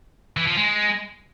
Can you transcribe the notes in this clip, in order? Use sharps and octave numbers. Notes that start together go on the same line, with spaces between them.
E3
F3
G#3